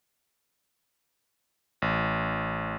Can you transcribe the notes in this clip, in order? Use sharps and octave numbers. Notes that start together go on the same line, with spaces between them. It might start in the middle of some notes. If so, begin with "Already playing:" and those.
A1